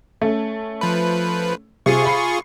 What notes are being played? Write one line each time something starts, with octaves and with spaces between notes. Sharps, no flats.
A3 C#4
F3 B4
C3 F4 G#4 C#6
B5 C7